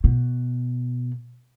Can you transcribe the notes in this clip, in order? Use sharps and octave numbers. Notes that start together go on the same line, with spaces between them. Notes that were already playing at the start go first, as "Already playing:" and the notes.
B2